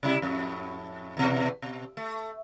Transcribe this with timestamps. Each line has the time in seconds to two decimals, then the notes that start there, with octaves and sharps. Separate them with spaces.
0.03 C3 G3 E4
0.22 F2 A2
1.17 E2 B2
1.62 B2
1.97 A3